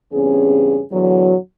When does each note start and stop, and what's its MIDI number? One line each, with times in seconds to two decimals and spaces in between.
0.12 0.81 40
0.12 0.81 43
0.12 0.81 49
0.12 0.81 60
0.12 0.81 61
0.12 0.81 68
0.92 1.35 40
0.92 1.35 45
0.92 1.35 50
0.92 1.35 54